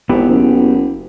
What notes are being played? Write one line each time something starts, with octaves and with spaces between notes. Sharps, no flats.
G#1 B3 E4 G4
F#1